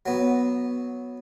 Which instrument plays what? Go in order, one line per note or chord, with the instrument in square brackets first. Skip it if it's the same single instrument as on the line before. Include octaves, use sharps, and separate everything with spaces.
[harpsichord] F#3 B3